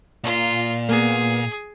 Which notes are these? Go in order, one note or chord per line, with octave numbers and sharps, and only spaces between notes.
A#2 F4
A#3 B3 G#4